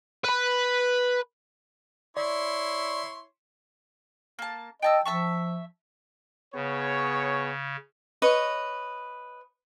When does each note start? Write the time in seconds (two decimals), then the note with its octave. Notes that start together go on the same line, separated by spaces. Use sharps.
0.24 B4 B5
2.17 E4 C#5 D5 C6
4.39 A#3 A5
4.82 D#5 G5 A5 E6
5.05 F3 E5 A5 C#6
6.55 C#3 B3 G#4 C#5
8.22 B4 C#5 D#5